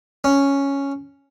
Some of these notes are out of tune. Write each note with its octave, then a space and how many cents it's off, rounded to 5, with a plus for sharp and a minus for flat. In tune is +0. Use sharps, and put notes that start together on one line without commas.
C#4 +0